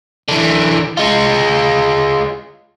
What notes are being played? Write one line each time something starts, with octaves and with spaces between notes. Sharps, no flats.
D3 E3
G#3 F4